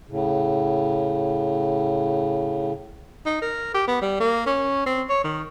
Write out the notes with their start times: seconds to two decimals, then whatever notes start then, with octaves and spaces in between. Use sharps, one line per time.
0.09 A2 C#3
3.25 D#4
3.42 A#4
3.74 G4
3.87 B3
4.01 G3
4.20 A#3
4.46 C#4
4.86 C4
5.09 C#5
5.24 D#3